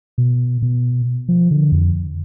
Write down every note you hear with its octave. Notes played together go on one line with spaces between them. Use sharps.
B2
B2
F3
D3
F2